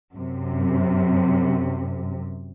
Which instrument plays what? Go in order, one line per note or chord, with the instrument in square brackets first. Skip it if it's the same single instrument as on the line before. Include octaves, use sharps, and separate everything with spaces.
[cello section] F#2 C3